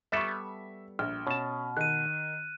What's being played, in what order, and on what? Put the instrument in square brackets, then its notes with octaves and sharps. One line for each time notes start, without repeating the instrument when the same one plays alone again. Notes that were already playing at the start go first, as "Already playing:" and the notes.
[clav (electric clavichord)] G3 B3 A4 [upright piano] E5 C#6
[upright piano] A#1 [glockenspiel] F6
[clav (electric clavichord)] B2 A5 [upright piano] C#4
[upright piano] D#3 [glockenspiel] F#6 D#7